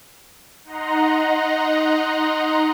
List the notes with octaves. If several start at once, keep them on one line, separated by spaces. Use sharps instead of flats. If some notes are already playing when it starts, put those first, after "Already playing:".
D#4 D#5 F#5 A#5 C6